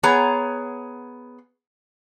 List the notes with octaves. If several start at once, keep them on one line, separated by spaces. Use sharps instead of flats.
B3 G#4 C#5 A#5